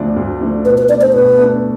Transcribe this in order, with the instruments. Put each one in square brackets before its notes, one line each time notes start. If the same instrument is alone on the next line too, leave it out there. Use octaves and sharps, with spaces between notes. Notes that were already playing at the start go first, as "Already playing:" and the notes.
Already playing: [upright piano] D2 D3 F3 A3 D4
D2
D3 F3 A3 D4
[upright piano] B2 [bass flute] B4
[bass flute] B4
[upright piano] A3 D4 [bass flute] D5
[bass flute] C5
[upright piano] B2 [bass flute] B4
[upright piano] A3 D4